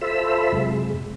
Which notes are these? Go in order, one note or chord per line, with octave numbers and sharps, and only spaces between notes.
F4 A4 C5 E5 B5 E6
F#2 C3 G#3